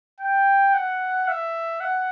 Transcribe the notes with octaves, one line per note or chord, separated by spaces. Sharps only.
G5
F#5
E5
F#5